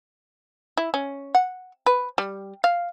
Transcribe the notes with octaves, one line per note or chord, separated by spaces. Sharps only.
E4
C#4
F#5
B4
G3
F5